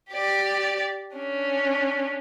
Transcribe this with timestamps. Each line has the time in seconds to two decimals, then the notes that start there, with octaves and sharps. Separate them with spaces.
0.11 G4 D5
1.16 C#4 D4